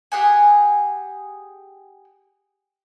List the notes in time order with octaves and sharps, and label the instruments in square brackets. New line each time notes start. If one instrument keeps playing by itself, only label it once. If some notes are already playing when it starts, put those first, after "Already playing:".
[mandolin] G4 G#4 F#5 G#5